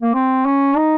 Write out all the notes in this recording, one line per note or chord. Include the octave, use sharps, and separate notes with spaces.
A#3
C4
C#4
D#4